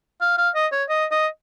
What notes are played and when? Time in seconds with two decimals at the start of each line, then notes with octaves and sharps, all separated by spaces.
0.21 F5
0.38 F5
0.55 D#5
0.72 C#5
0.89 D#5
1.11 D#5